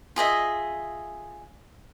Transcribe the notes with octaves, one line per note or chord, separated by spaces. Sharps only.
F4 G#4 D#5 E5